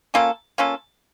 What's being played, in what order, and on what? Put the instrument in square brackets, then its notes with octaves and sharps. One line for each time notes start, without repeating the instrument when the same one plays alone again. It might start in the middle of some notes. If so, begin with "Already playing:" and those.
[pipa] A#3 C#4 F4 A4
A#3 C#4 F4 A4